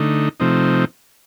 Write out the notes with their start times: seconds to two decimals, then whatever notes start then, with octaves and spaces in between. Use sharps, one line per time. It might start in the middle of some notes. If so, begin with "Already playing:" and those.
Already playing: D3 A3 D#4
0.40 C3 F3 A3 C4 D#4